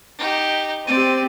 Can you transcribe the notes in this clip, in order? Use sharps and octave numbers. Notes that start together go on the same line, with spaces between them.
D#4 G4
C4 G4 D5 D#7